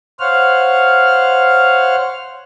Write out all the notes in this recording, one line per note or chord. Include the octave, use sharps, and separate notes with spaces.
C5 C#5 F5 F#5 F6